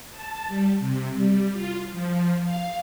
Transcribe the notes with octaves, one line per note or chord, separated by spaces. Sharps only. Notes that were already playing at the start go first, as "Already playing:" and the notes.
A5
G3
C3
G3
F4
F3
F5